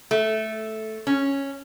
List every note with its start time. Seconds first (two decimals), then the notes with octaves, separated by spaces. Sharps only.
0.11 A3
1.07 C#4